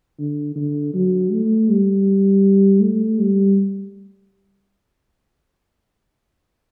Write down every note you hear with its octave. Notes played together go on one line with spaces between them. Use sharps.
D3
D3
F#3
A3
G3
A3
G3